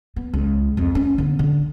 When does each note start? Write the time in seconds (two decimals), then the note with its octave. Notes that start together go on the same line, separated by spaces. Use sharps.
0.16 B3
0.33 C#2
0.77 F2
0.95 C#4
1.18 D3 B3
1.39 D3